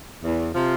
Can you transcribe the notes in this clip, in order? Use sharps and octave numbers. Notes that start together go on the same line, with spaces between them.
E2
C3 F3